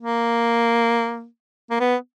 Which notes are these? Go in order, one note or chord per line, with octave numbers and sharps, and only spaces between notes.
A#3
A#3
B3